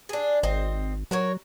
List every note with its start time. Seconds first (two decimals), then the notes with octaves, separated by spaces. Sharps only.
0.09 D4 G#4
0.43 G#1 C4 D#5
1.11 F#3 F#4 A#4 C#5